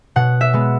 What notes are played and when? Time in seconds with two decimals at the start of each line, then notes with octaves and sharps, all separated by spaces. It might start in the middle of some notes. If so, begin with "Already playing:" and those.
0.16 B2 F#5
0.41 E5
0.53 G#3 B3